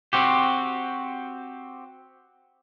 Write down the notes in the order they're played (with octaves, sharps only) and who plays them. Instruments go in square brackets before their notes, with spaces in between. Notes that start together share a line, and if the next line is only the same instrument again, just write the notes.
[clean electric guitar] C4 F#4 G4